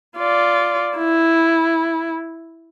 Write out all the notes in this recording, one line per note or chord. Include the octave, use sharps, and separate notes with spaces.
F4 D5
E4